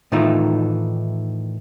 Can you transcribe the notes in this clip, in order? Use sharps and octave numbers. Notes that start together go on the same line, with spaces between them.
A2 D#3 E3 A3 D#4 F4